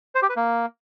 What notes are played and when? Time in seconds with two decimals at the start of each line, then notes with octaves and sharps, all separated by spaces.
0.15 C5
0.22 G4
0.29 B4
0.37 A#3